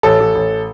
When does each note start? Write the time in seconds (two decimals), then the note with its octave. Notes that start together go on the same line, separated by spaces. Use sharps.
0.03 A1 A4
0.20 A1
0.35 A1